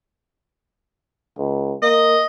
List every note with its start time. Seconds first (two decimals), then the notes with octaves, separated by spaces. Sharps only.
1.38 C#2
1.83 A#3 D#5